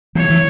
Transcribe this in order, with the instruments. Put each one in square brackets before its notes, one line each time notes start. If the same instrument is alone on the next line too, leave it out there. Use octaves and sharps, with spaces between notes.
[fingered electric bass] E3 [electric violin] C#5
[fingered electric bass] E3